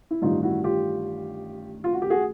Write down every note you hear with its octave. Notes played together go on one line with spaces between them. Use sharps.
E4
A1 G2 D#3 D#4 F4
E4 F#4
F4 G4
F4
F#4
G4
F#4 G#4